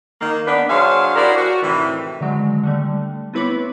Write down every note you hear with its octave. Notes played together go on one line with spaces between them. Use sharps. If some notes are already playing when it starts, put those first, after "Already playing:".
D#3 A#3
B3 D4 B4
F#3 D4 G#4 C5 C#5 F5
E4 F#4 G4 A#4 C5 D5
F#4
A2 C3 D#3 E3
D3 D#3 F#3 G#3
D3 G3 A3
B3 C4 E4 B4 C#5 D6